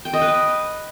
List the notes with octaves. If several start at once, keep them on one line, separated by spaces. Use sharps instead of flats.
G5
D#5
B4